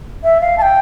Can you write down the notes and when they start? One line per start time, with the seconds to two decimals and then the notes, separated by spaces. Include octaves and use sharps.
0.23 E5
0.40 F5
0.57 A5
0.61 G5